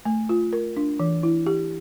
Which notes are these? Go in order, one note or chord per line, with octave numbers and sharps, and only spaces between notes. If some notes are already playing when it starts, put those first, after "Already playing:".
A3
F4
A#4
D4
E3
E4
G4